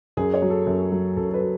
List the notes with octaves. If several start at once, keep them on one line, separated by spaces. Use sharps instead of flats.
F#2 G#4
C#5
F#3
A4
F#2
F#3
F#2 A4
A4
B4
F#3